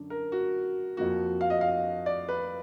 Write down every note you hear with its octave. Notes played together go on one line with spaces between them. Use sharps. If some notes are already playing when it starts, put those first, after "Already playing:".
Already playing: F#2 D3 D4
A#4
F#4
F2 F3 A#3 F#4
F5
D#5
F5
D5
B4